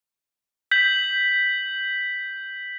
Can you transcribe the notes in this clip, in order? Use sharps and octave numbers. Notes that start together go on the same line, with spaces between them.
G6 B6 F#7